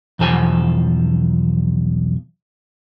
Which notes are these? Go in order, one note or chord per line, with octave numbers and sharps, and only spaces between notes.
B1 E2 F3 A4 C5 G#5